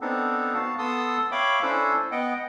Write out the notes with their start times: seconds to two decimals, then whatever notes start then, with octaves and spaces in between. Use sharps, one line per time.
0.01 B3 C4 D4 D#4 A4
0.54 B3 F#4 F5 A5
0.78 B3 A4 A5 C6 D#6 E6
1.32 C#5 E5 F5 G5 B5 D6
1.62 C#4 D4 E4 A4 C5
2.12 B3 D#5 F#5 G5